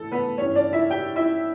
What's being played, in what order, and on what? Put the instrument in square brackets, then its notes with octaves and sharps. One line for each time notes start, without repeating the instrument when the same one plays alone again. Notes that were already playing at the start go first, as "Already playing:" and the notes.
Already playing: [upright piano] A2 E3 A3 A4
B3 B4
G2 E3 G3 C#4 C#5
D4 D5
E4 E5
G4 G5
E4 E5